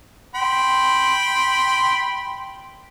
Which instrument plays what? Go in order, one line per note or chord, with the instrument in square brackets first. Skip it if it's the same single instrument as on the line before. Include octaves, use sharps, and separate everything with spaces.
[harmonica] G5 B5 C6